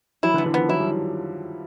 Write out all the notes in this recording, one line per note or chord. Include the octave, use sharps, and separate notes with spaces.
E3 F#3 E4
D3 E3
B3
D3 E3
D#3 F3 B3
E3 F#3 E4
F3 G3